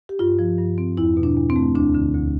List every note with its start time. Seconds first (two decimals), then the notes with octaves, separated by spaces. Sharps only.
0.09 G4
0.19 G2 F4
0.39 F3
0.59 G2
0.78 C4
0.97 E2 E4
1.17 B2
1.23 D4
1.36 E2
1.50 C4
1.56 A3
1.75 D2 D4
1.94 D3
2.14 D2